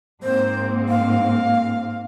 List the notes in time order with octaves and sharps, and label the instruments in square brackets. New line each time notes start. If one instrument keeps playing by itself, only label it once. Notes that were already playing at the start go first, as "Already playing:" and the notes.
[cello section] G#2 A#3 C4 [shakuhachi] C5
[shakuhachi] F5